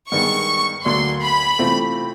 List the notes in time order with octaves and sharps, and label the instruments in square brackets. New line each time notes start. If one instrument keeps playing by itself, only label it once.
[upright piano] G2 D#3 G#3 B3 [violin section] C#6
[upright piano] D2 D3 F#3 A#3 D4 [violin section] C6
[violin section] B5
[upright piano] C3 E3 A3 C4 F4